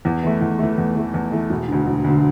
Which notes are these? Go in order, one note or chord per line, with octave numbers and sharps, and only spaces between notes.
E2
E3 A3
E2
E3 A3
E2
E3 A3
E2
E3 A3
E1
D2 D3
E1
D2
D3